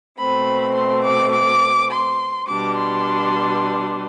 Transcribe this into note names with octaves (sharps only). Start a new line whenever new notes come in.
B2 A3 C4 B5
C6
D6
D6
C6
B2 G3 D4 D6
C6